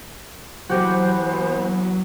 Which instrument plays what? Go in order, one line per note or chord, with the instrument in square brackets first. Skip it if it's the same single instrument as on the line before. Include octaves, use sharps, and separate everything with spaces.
[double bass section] E3 B3 [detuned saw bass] F#3 [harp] F#4 G4 [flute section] C5